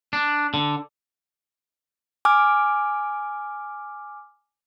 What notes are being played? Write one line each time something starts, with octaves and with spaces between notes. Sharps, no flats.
D4
D3
G#5 D6 F6